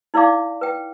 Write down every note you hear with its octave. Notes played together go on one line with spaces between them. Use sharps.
D#4 E4 D5 F5 D6
B4 G5